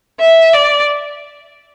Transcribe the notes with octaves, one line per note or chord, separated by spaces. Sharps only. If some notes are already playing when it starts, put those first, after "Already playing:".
E5
D5